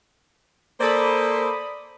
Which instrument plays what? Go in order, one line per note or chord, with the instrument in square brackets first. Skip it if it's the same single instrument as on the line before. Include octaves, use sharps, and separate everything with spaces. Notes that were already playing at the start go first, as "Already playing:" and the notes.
[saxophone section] A#3 A4 C5 [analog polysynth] D5 B5 D#6